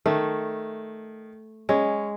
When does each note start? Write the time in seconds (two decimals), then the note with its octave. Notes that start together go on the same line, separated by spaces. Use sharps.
0.06 D#3 A3
1.69 G#3 C#4